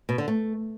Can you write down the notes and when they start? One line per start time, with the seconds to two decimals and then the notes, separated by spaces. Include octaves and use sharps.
0.09 B2
0.18 D3
0.28 A3